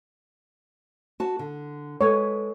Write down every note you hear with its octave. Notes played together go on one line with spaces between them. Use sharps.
F#4 A5
D3
G#3 A4 B4 C#5